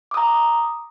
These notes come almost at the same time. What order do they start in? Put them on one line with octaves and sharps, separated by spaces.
D6 D#6 A#5